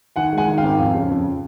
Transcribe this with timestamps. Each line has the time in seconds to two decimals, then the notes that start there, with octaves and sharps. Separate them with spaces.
0.16 D#3 F#5 G#5
0.32 G#3
0.38 F#5 G#5
0.48 D#3
0.57 F5 G5
0.63 G#1
0.79 F2
0.94 C#3
1.10 F2